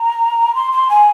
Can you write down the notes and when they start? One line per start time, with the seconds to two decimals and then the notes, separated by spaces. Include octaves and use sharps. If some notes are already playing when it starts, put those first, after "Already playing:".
Already playing: A#5
0.55 C6
0.72 C6
0.89 G#5